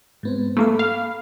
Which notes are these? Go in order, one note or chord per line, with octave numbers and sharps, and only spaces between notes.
G#2 B3 C4
A3 A#3 A4 B5
F5